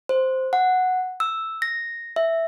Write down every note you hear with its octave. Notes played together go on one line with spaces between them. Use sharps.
C5
F#5
E6
A#6
E5